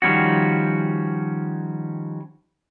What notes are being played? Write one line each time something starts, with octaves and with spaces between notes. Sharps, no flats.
D#3 F3 G3 C#4 F#4